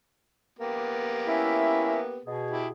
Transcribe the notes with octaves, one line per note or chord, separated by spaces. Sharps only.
A#3 B3 G4
C#4 E4 E5
B2 G#4
E4 G4